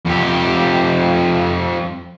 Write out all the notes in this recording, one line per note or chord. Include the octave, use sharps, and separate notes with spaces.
F2 G4